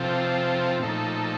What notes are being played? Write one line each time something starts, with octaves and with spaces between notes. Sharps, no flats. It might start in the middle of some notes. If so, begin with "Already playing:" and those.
Already playing: C3 F3 C4 F4 A4
A#2 F3 A3 D#4 A4